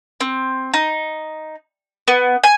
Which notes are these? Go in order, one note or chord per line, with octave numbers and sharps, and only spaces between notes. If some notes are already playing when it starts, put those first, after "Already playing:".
C4
D#4
B3
G#5